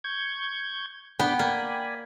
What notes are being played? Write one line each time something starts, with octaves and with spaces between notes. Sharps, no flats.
C#6 G6 G#6
B3 D4 G5 B5 D6
A#3 D5 G#5 B5